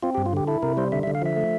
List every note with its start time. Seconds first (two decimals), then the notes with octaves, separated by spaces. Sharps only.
0.03 C4 F4
0.15 G4
0.17 G2
0.26 F4
0.33 D3 G4
0.47 E4 A4
0.63 C3 A#4
0.77 G3 C5
0.92 D3 E5
1.03 E5
1.07 D3
1.15 F5
1.22 F3 E5
1.36 A3